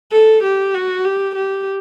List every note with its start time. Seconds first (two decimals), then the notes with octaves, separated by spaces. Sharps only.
0.12 A4
0.43 G4
0.74 F#4
1.05 G4
1.35 G4